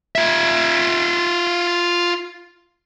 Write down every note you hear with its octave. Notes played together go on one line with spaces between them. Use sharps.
F4 E5